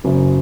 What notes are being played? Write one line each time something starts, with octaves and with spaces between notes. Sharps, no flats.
F#1 F#2 F#3